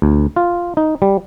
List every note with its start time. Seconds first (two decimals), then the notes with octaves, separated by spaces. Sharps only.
0.02 D2
0.36 F4
0.77 D#4
1.02 G3